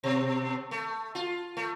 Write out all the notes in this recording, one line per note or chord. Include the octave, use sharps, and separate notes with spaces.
B2
A3
F4
A3